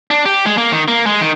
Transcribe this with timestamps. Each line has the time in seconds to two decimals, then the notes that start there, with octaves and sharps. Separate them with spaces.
0.11 D4
0.26 G4
0.46 G#3
0.58 A#3
0.72 D#3
0.88 A#3
1.06 G#3
1.21 D#3